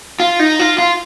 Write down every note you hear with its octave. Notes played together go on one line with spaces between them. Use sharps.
F4
D#4
F4
F4